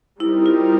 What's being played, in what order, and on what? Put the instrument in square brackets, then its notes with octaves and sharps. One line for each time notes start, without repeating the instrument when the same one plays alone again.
[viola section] G3 C4 D#4 G4 A#4 [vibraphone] E4
[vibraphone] F4